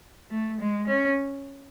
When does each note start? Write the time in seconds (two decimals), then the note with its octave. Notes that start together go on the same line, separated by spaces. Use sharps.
0.31 A3
0.60 G#3
0.87 C#4